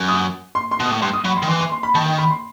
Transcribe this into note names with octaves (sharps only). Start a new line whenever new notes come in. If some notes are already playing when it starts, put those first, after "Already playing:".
Already playing: F#2
D#6
C6
C6
B2
D#6
A2
G2 C6
D#6
F#3 B5
C6
D#3
E3 C6
C6
C6
B5
D#3 A5
G5
B5
C6